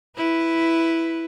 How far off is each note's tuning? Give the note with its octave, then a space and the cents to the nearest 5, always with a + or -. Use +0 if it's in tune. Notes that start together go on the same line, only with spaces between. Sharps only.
E4 +0 B4 +0